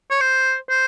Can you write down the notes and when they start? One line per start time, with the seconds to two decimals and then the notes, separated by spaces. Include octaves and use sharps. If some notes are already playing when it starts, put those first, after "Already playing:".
0.11 C#5
0.21 C5
0.70 C5